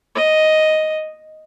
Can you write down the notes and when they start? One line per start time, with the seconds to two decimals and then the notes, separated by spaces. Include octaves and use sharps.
0.15 D#5